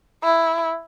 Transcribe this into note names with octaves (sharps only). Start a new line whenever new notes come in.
E4